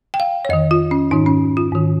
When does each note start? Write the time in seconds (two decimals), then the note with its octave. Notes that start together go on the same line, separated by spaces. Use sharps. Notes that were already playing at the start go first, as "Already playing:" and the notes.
0.14 G5
0.20 F5
0.45 C#5
0.49 F2 D#3 D#5
0.71 F4
0.91 C#4
1.11 G#2 D#3 D#4
1.26 C#4
1.57 F4
1.72 G#2 D#3